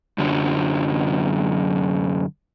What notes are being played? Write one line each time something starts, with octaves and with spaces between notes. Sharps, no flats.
F#2 D3 F#3